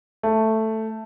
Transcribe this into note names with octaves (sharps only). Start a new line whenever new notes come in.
A3